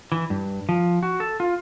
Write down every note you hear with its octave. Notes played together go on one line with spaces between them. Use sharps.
E3
G2
F3
F#4
A4
F4